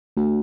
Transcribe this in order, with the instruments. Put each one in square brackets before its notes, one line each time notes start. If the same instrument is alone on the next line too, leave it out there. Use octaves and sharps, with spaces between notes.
[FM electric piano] A3 D4 F#4